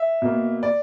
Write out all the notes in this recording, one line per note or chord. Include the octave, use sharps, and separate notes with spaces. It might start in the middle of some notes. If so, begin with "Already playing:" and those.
Already playing: E5
B2 A#3
D5